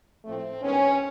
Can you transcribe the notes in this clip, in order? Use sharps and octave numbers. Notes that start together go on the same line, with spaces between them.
A2 F3 A3 C4
G2 D#3 G#3 B3 C#4